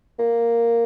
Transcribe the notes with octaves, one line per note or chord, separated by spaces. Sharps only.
A#3